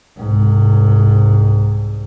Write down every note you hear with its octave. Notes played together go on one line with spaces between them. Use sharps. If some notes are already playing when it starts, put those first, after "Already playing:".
C2 G#2